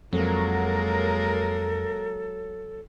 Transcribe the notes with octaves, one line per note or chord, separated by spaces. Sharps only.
F2 F#3 G#3 A#3 A4 A#4